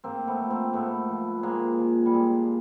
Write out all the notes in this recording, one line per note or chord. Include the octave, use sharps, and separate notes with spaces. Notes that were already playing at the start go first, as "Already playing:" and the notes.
G#2 A#3 C4
A3 B3
F3
A#3 C4
G#2 A3 B3
F3
A#2 G#3 A#3
F3
G3
A#2 G#3